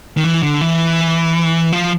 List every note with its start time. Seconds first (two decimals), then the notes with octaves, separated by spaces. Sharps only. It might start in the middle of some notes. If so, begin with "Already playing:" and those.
0.17 D#3
0.24 E3
0.43 D3
0.61 E3
1.72 F3